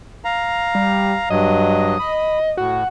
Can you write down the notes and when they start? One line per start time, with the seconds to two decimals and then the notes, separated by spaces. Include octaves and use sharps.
0.25 F5 A#5
0.75 G3
1.30 G2 F#3 D#5
1.99 B5
2.57 A2 F#4